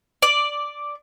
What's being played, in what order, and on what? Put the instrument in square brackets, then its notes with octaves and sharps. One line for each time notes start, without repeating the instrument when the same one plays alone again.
[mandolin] D5